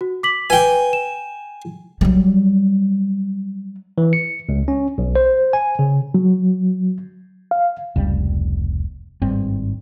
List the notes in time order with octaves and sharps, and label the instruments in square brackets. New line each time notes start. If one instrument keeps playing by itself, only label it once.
[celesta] F#4
D6 B6 F#7
[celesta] B4 G7 [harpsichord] G5 G#5
[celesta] E7
[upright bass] F#3 G3
[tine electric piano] E3
C#7
C#2
C#4
B1
C5
G#5
C#3
[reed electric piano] F#3
F5
[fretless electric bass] F1 C#2 G3
G#1 G2 G3 C4